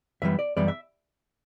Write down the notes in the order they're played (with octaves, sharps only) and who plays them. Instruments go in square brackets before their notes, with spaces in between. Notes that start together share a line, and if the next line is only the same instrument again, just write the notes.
[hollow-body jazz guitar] F#2 E3 G3 B3 E5
D5
F#2 E3 G3 B3 D5
E5